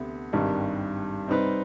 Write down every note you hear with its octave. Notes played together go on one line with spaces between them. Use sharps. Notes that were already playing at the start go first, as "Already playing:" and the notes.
Already playing: D2 C3 B3
G#1 G2 D#3 G3
C3 G3 C4 D#4 B4